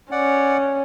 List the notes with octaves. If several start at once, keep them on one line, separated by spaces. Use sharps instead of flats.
C#4 D5 F#5